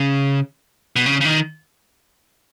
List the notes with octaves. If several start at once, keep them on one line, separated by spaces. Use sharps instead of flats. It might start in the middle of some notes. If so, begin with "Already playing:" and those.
Already playing: C#3
B2
C#3
C#3
D#3